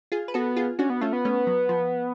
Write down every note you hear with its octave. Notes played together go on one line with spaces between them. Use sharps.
F4 G#4
B4
B3 F#4 A4
F4 G#4
C#4 D4 F#4
B3
A3 C#4 F4
B3
A3 C#4
F#3
F3